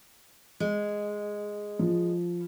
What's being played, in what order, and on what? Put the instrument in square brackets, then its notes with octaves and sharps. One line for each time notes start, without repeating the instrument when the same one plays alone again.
[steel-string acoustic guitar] G#3
[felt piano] F3